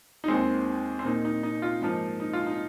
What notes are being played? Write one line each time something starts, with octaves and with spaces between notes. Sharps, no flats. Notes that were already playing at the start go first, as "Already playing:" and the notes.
D#4
D#2 D#3 G#3 C4
C4
A#2 A#3 D#4
D#4
D#4
F4
G#2 F3 A#3 D#4
D#4
F4
D#4